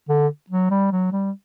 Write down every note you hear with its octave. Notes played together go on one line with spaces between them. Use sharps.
D3
F#3
G3
F#3
G3